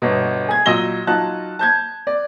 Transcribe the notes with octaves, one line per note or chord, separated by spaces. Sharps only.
G1 B2
G#4 G#6
A#2 F#3 D#5 E6 A#6 G7
F#3 D#4 F4 A5 F#6
A5 G6 G#6
D5